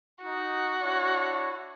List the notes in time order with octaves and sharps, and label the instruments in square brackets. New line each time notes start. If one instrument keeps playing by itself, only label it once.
[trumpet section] D#4 [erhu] F#4
[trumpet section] D4 E4 C#5